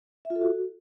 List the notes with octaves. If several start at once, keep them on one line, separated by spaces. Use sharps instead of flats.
E5
F4
A4
F#4